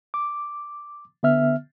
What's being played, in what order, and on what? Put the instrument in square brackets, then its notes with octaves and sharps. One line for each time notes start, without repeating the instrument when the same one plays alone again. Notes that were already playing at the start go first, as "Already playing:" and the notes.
[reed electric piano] D6
D3 B3 E5 F6